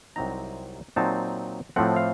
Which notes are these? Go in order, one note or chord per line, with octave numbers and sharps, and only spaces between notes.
C2 C3 F#3 C4 D#4 A#5
A#2 F#3 C4 D#4 A5
A2 F3 A3 C4 F#5
F5